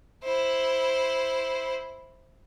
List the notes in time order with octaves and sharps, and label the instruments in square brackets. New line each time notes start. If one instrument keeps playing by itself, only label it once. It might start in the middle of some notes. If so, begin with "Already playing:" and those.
[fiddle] E4 C5